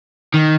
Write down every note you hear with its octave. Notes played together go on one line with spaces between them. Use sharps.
D#3